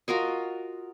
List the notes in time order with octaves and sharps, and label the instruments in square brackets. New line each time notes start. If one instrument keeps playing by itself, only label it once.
[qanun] F4 F#4 A#4 D#5